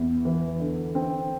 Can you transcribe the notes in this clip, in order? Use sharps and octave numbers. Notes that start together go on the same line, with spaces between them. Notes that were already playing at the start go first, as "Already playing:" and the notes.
Already playing: E2
E3
D3
C4